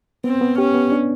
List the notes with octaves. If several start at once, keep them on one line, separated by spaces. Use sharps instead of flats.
B3 C4
B3
C#4 G4
B3
D4